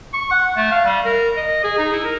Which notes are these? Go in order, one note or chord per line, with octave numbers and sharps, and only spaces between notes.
C#6
F#5
A3
F5
G3
A#4
D#5
G#4
D#4
E4
A#4